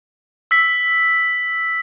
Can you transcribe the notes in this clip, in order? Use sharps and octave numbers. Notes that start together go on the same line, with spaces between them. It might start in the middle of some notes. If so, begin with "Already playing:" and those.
E6 B6